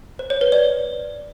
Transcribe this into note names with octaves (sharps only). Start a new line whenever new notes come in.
C5
C#5
B4
D5